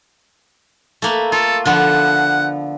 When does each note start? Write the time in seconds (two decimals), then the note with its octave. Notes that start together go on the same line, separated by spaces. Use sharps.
1.02 A3 A#3 B4
1.32 F4 A4
1.65 D3 F3 B3 F#5